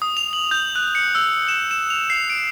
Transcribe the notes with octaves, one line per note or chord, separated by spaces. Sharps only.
D#6
F7
F#7
G6
F#6
C#7
E6
E7
E7
F7
C7
D7